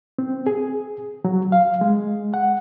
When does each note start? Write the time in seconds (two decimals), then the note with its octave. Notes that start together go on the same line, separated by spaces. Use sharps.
0.19 C4
0.47 G#4
1.25 F#3
1.52 F5
1.81 G#3
2.34 F#5